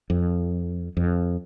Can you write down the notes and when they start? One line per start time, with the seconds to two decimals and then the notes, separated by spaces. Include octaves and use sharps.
0.10 F2
0.97 F2